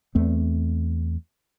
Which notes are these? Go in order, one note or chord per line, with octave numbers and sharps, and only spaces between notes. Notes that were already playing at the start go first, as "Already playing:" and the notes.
E2 A3 C4